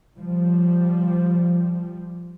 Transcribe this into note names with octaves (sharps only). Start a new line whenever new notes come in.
F3 G3